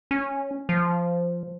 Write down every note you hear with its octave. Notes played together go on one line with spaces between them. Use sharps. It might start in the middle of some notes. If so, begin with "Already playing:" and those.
C#4
F3